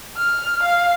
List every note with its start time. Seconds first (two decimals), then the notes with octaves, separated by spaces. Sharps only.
0.17 F6
0.63 F5